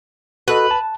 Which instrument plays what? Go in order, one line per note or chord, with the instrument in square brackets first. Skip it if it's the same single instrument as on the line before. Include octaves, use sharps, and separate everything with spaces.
[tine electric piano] F#4 A4 D#5 [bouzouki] B4
[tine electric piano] A5